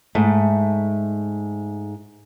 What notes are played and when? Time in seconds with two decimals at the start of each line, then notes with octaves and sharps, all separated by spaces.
0.15 G#2 A3